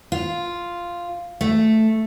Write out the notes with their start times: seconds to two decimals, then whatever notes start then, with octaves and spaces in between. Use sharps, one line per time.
0.12 F4
1.41 A3